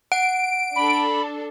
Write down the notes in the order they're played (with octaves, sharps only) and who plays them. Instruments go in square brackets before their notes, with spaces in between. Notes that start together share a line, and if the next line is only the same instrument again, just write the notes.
[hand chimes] F#5 [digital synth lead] D7
[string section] D4 A4 [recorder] B5